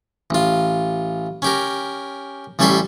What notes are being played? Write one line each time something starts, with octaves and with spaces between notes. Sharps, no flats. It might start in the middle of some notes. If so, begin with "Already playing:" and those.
A1 F4
C#4 G4 A#4
A1 G3 C#4 A4 E5 C6